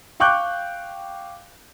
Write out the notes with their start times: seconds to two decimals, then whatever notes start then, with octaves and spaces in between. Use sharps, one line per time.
0.20 F5 G5 C#6 D6 F#6 G6